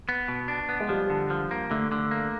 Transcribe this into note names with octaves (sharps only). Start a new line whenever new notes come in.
B3
B2
D4
B3
G#3
F3 G3
D3
F3
A#3
D3 A3
D3
A#3